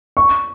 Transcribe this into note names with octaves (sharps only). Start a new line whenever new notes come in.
C#6